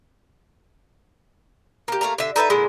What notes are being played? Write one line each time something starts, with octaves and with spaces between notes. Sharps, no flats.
A#3 G4
A3 A#3 F5 A#5
D3 E5
D#4 A4 B4 E5
A#2 D3 G#3 E4